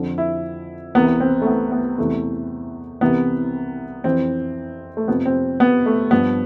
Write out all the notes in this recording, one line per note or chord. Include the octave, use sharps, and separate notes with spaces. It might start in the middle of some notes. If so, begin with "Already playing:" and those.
Already playing: F2 D3 F3
E4
C2 C3 E3 B3
C4
A3
B3
B3
E2 C3 E3 A3
C2 C3 E3 B3
F2 E3 C4
A3
F2 C3 F3 B3
C4
B3
A3
G2 F3 B3